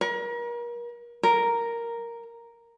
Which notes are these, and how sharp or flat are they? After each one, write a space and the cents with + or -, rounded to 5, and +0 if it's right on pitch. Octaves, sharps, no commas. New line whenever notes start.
A#4 +35
A#4 +0